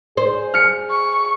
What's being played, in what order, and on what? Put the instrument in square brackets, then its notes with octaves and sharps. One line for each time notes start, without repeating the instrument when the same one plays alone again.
[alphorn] G#4 [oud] C5
[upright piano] F6 C#7
[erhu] C#6